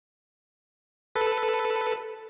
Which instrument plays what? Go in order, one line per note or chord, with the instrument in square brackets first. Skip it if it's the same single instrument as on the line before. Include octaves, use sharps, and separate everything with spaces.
[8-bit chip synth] A4 B4